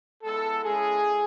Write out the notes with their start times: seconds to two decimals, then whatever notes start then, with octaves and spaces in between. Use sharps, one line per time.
0.24 G#3 B3 E4 A4
0.63 G#3 C#4 E4 G#4